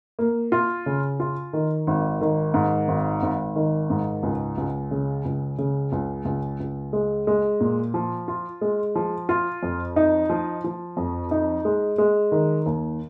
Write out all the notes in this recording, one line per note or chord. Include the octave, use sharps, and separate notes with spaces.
A#3
F4
C#3
F4
D#3
G#1
D#3
G#2
G#1
G#1
D#3
G#2
C#2
C#2
C#3
C#2
C#3
C#2
C#2
C#2
G#3
G#3
A#2
F3
F4
G#3
F3
F4
F2
D#4
F3
F3
F2
D#4
G#3
G#3
D#3
D#2